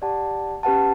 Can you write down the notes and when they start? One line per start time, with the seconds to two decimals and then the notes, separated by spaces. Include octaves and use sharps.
0.02 G4 D5 F#5 A5
0.63 C#4 G4 B4 F#5 A5